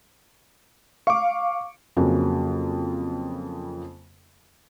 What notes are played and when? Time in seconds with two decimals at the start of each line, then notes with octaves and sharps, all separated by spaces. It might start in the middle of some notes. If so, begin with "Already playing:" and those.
1.07 F5 C#6 D6
1.97 F2 C#3 F#3 A#3